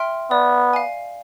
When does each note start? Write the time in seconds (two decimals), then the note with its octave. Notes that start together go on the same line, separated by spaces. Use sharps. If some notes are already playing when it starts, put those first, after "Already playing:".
Already playing: E5 G5 C6 F6
0.31 B3 D5
0.73 F5 G#5